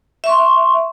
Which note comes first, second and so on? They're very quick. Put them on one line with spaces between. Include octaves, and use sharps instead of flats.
E5 C#6 C6